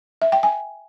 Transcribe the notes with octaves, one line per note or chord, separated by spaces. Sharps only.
E5
G5
G#5